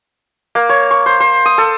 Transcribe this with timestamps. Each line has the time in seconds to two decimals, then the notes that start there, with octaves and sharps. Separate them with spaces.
0.55 A#3
0.69 C#5
0.91 C#6
1.06 C5
1.20 C5
1.45 D#6
1.58 A4